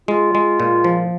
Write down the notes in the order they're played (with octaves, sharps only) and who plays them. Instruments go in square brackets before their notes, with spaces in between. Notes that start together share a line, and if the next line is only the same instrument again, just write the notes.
[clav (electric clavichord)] G#3 [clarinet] F4
[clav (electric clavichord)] G#3
A#2
F3